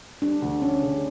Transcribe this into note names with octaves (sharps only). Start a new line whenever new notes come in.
G3 D4
D2
D2 C#4
C#3